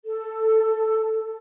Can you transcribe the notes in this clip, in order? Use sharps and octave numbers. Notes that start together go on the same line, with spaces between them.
A4